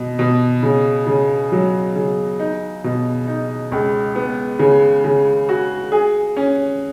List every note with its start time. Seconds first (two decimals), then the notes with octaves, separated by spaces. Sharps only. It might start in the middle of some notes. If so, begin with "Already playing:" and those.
Already playing: B2
0.19 B2
0.63 C#3
1.07 C#3
1.52 F#3
1.96 C#3
2.39 D#4
2.84 B2
3.27 D#4
3.72 C#2
4.15 B3
4.59 C#3
5.04 C#3
5.49 F#4
5.92 G#4
6.37 C#4